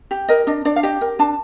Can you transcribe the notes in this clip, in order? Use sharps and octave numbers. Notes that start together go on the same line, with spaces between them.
G4
A#4 D#5
D4 D#5
D4 D5
F5
G4 D#5
A#4 G5
D4 A5